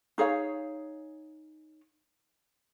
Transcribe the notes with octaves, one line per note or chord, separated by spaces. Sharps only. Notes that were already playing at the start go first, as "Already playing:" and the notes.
D#4 G#4 C#5 F5